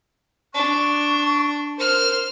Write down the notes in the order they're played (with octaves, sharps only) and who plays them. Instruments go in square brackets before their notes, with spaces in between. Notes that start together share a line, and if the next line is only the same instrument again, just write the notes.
[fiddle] D4 [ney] C#6
[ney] A#4 [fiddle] C5 F6